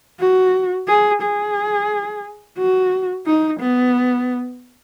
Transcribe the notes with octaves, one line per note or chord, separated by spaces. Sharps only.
F#4
G#4
G#4
F#4
D#4
B3